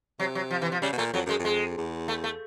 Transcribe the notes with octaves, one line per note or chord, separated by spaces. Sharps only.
C3 F#3
F#3
F3
E3
F3
C#3 G3
B2
A#2 A3
F2 F#3
F#2 G#3
F2
G#3
E2
A3
A3